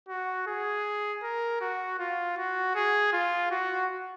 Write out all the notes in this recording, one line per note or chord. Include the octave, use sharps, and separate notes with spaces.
F#4
G#4
A#4
F#4
F4
F#4
G#4
F4
F#4